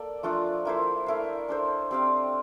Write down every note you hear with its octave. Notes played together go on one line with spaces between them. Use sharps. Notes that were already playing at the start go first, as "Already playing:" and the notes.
Already playing: A#3 A4 D5
F3 A3 D4 F4
A#3 E4 A4 C5
A3 E4 A#4 F5
D4 A4 C5
C4 G4 D5 F5